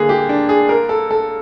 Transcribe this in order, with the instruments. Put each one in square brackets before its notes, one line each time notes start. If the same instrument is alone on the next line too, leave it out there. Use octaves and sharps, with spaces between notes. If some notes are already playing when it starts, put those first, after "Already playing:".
Already playing: [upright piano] D3 A#3 [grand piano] G#4
[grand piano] G4
D4
G#4
A#4
A4
A4